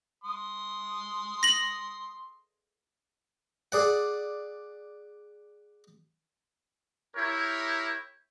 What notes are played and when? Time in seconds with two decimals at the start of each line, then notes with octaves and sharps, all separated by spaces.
0.24 C6 D#6
1.43 A#6 F#7
3.72 G#4 D5 F#5
7.15 E4 G4 A#4 C#5